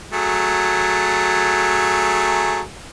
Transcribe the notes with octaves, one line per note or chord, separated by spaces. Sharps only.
F#3 A3 G#4